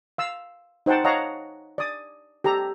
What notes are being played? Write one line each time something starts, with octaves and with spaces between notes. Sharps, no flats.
F5 E6
D#4 C5 F#5 G5 A5
C#5 D#5 F5 F#5 A5 A#5
D5 D#6
G4 A4 A#5